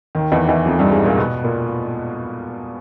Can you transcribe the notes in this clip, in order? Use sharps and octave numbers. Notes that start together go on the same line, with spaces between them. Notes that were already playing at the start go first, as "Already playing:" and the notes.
D#2 D#3
E2 E3
E2 E3
F2 F3
G2 G3
G#2 G#3
A#2 A#3
B2 B3
A#2 A#3